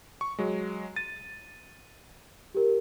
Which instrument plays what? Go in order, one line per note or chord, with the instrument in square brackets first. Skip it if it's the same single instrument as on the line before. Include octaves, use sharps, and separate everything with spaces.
[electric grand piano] C#6
F#3 G#3
[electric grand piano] A6 [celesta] D#7
[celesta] G4 A#4